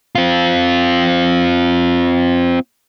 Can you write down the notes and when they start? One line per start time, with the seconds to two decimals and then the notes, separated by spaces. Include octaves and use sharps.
0.15 C4 F4